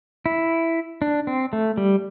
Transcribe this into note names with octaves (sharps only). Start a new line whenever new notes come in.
E4
D4
C4
A3
G3